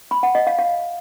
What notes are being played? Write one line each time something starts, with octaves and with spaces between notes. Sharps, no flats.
B5
F#5
D#5
F5
F5